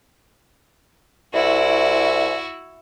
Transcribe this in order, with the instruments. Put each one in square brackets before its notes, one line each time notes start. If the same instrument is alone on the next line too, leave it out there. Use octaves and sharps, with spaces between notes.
[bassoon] C2 [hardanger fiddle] E4 F#4